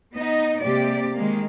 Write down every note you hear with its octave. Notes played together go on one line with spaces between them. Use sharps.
B3 D#4 D#5
C3 G#3 A#3 G4 D5
D#3 G#3 A#3